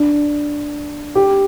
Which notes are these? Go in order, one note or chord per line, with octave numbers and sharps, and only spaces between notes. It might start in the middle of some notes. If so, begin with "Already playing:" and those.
Already playing: D4
G4